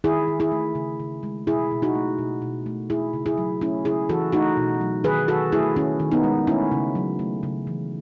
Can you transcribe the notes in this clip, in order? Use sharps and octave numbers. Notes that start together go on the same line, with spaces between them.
D#3 E4 G#4
D#3
E4 G#4
A3
C#3
C#3
G#3
B2 E4 G#4
B2
D#4 F#4
A3
B2
B2
A3
A3 E4 G#4
C#3
E4 G#4
F#3
A3 C#4 E4
C#3 E4 G#4
E3 F#4 A4
A3 D#4 F#4
B2
F#3
D#3 G#4 B4
D#3 F#4 A4
A3 E4 G#4
D#3 C#4 E4
D#3
B3 D#4
G#3
A3 C#4 E4
C#3
F#3
A3
C#3
E3